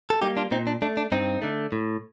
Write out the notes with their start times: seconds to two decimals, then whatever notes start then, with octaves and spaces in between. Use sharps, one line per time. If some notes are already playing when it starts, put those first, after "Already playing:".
0.10 A4
0.22 G3 A#3 D#4 G4
0.37 D4 F4
0.51 A#2 C4 D#4
0.67 D4
0.82 A3 D4
0.97 D4
1.12 G2 C4 D#4
1.42 D3 A3
1.72 A2